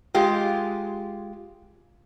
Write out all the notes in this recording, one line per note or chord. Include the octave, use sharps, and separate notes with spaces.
G#3 F4 G4